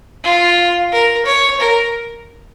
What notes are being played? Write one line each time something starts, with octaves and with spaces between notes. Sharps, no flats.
F4
A#4
C#5
A#4